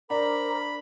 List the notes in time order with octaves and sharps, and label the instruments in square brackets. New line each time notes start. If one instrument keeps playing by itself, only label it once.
[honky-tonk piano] D4 [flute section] A#4 C5 D6 [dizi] A#5 [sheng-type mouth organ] B5